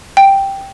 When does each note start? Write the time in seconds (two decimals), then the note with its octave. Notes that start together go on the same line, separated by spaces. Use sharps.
0.17 G5